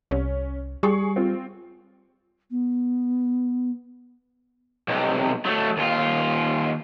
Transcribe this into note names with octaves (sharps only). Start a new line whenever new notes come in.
C2 C#4
G3 G#4 C#6
C4 F4
B3
B1 C3
F#3 A3
D#2 F4